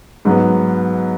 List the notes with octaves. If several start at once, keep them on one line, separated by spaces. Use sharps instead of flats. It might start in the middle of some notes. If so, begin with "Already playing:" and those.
G#2 F#3 B3